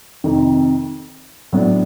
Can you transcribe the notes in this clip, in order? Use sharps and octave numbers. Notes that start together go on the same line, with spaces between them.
F2 C3 D#3
A2 F#3 B3 D4